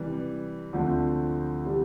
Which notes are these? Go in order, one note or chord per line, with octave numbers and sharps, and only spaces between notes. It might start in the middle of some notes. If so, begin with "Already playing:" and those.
Already playing: C3 E3 G3
D2 D3 F3 A3 C4
C3 E3 G3